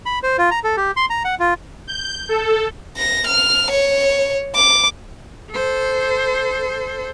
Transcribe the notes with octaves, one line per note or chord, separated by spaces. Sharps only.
B5
C5
F4
A#5
A4
G4
C6
A#5
F#5
F4
G6
A4
A#6
F6
C#5
D6
A4 C5